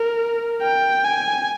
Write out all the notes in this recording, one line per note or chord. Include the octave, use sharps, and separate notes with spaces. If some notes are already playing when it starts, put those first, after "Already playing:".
Already playing: A#4
G5
G#5